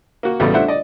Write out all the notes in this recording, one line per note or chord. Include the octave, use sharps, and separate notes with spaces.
A#3 F#4
A1 C#3 G3 A3 B3 F#4
A3 D4 C5 E5 F#5
D5 D#5